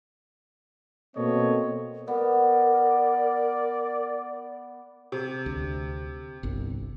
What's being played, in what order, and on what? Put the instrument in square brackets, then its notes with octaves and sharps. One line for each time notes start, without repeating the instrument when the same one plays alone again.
[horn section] B2 A#3 C4 A4 C#5 D#5
[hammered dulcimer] B3 [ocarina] A#4 [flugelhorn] D5
[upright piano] C3
[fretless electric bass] D2
G1 C2